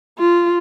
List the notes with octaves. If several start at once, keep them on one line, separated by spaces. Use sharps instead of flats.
F4